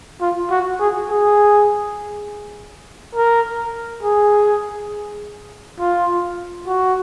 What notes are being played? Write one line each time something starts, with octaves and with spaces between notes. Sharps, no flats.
F4
F#4
G#4
G#4
A#4
G#4
F4
F#4